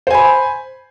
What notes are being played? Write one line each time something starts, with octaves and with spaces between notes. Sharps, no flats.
C5 G#5 B5